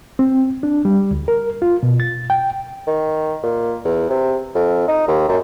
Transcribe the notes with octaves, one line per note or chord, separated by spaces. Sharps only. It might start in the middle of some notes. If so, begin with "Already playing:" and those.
C4
D4
G3
D2
A#4
F4
B2
A6
G5
D#3
A#2
E2
C3
F2
D#4
D#2
F#2